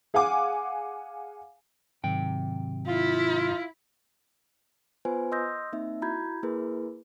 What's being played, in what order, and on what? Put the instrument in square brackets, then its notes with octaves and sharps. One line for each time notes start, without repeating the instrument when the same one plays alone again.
[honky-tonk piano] G#4 F5 F#5 G#5 D6
[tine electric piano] G#2 D#3 F#3 [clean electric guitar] C3 G5
[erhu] E4 [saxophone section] F4
[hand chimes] B3 F4 B4 C5 G#5
D#5 C6 D#6 E6 G6 A#6
A#3 C4 D#4 E5
E4 F#4 A#5 B5 G6 G#6
A#3 E4 G#4 A#4 B4